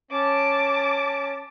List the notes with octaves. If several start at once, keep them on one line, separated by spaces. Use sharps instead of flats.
C#4 A5 D6